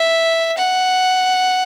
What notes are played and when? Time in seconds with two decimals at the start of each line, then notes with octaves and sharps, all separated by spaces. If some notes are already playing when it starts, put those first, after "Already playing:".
Already playing: E5
0.57 F#5